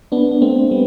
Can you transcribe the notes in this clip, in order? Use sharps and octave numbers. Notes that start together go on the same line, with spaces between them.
B3 D4
B3
A3 C4
G3 B3